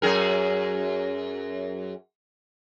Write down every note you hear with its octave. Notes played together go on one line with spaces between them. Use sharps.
F#2 G#4 A#4